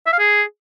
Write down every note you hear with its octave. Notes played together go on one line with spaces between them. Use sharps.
E5
F5
G#4